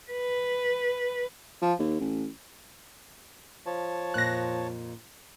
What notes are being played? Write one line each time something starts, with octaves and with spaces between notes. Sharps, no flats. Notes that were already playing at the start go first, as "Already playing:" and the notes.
B4
F3
D#2
A1
F3 C#5 A5
F2 A#2 F#6 A#6